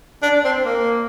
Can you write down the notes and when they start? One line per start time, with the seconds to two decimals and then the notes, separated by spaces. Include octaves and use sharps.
0.23 D4
0.45 C4
0.65 A#3